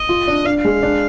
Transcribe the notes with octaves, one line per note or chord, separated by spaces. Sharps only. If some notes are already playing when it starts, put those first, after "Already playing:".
Already playing: D#5
F4
D4
D4 F5
F5
G#3
D4